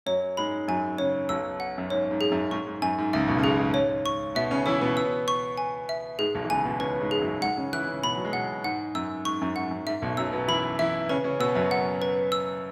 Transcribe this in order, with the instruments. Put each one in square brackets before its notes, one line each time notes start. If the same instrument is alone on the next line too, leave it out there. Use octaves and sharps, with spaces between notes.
[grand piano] F#2 F#3 [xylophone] C#5
[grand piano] G#2 G#3 [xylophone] B5
[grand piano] F#2 F#3 [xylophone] G#5
[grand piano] C#3 C#4 [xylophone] C#5
[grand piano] B1 B2 [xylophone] E6
[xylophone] F#5
[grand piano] F#2
[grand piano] G#2 [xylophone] C#5
[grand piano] G#2
[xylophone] G#4
[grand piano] F#2
[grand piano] G#2 [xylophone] C#6
[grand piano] G#2
[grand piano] F#2 [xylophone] G#5
[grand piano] G#2
[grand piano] C#2 C#3 [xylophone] E5
[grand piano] B1 B2
C#3
[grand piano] B1 B2 [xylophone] G#4
[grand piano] G#2
[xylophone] C#5
C#6
[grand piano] B2 B3 [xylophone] E5
[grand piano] C#3 C#4
[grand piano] E3 E4 [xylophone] C#5
[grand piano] B2 B3
[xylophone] E6
C#6
G#5
E5
[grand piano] G#2 G#3 [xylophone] G#4
[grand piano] B1 B2
E3
[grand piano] C#2 C#3 [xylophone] G#5
[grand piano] B2 B3
[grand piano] C#3 C#4 [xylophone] B4
[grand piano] G#2 G#3
[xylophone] G#4
[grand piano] F#2 F#3
[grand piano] G#2 G#3 [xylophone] F#5
[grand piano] C#3 C#4
[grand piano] E3 E4 [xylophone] F#6
[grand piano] C#3 C#4
[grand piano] B2 B3 [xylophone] B5
[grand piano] F#3
G#3
[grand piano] B2 B3 [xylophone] F#5
[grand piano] G#2 G#3 [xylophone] F#5
[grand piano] F#2 [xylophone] E6
[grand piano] G#2 [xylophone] C#6
[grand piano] F#2
[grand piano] G#2 [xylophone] F#5
[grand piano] F#2
[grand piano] G#2 [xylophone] E5
[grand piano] B1 B2
[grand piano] F#2 F#3 [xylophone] E6
[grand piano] B2 B3
[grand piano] E3 E4 [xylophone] B5
[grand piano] E3 E4 [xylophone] E5
[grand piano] C#3 C#4 [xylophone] B4
[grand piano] C#3 C#4
[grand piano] B2 B3 [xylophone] E6
[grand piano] F#2 F#3
[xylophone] F#5
B4
E6